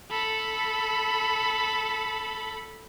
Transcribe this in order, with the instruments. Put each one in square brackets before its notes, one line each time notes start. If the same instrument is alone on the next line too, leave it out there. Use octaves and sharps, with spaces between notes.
[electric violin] A4 B5